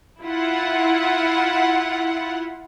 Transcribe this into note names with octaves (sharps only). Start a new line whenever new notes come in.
E4 F4 F#5